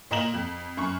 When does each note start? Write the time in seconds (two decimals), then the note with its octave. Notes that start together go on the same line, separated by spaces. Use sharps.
0.11 A#2 D#5 A#5 E7 F#7
0.34 F2
0.77 F#2 C#6